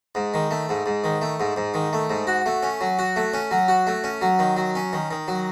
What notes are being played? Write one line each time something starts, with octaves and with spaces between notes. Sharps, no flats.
G#2
D#3
A3
G#2
G#2
D#3
A3
G#2
G#2
D#3
A3
G#2
F#4
A3
C#4
F#3
F#4
A3
C#4
F#3
F#4
A3
C#4
F#3
D#3
F#3
C#4
D#3
D#3
F#3